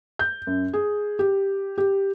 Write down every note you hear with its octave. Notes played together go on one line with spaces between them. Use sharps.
G6
F#2
G#4
G4
G4